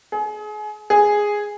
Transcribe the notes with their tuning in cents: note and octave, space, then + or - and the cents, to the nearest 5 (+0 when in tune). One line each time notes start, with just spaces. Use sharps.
G#4 +30
G#4 -5